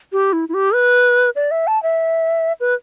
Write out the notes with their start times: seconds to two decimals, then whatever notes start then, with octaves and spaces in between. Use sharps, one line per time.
0.12 G4
0.33 E4
0.49 E4
0.54 G4
0.74 B4
1.36 D5
1.51 E5
1.67 A5
1.83 E5
2.60 B4